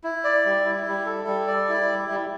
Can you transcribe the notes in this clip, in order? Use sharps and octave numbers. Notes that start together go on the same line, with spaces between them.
E4
D5
G3
E4
G3
A4
G3
D5
E4
G3
G3